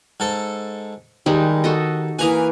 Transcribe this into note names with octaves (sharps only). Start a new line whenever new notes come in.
G#2 A4
D#2 G3 G#3 D#4
F#4 A4 D#5
E3 A#3 B4 G#5 A#5 D#6